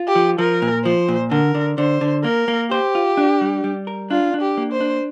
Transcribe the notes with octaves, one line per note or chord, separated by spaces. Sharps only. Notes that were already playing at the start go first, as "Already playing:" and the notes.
Already playing: F4
G4
F3
F3 A#4
A#2
F3 C5
A#2
D3 A#4
D3
D3 C5
D3
A#3 A#4
A#3
G4 C5
F4
D4
G3
G3
A#4
D4 F4
D4
G4
A#3
C5
D4